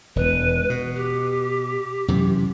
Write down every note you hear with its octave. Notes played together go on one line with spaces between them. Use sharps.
E1 B4
B2
G4
F#2 C3 E3